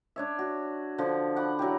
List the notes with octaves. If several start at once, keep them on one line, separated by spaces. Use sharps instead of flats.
D4 C#5 E5
F#4
D3 F3
F#5 B5 D6
F#3 E4 G4